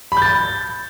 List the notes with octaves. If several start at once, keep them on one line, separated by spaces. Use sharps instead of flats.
B5
G6
A6